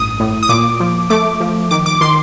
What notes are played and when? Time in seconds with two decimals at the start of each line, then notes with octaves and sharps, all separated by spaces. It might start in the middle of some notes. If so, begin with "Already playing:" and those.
Already playing: A1 G2 D#6
0.20 A2
0.43 D#6
0.49 A#2 D6
0.80 F3
1.10 A3 D6
1.40 F3
1.71 D#3 D6
1.86 D6
2.01 D#3 C6